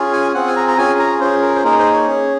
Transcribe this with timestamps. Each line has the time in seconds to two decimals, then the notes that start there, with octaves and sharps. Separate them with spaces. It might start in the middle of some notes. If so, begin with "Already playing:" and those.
Already playing: C#4 F4 G#4
0.13 G#5
0.35 C4 F4 G#4 F#5
0.47 G#5
0.56 A#5
0.68 A#5
0.78 C#4 F4 G#4 G#5
0.99 A#5
1.20 C#4 F4 G#4 C5
1.42 A#4
1.56 C5
1.64 A#3 D#4 G#4 A#4
1.79 C5
1.93 C#5
2.07 C#4 G#4